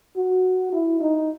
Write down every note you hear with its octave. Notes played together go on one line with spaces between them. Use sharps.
F#4
E4
D#4